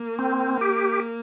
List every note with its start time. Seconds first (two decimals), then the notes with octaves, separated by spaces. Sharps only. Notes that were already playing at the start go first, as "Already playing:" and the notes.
Already playing: A#3
0.19 C4
0.61 G4